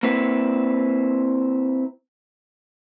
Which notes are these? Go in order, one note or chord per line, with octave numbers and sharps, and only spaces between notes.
A#3 C4 E4 B4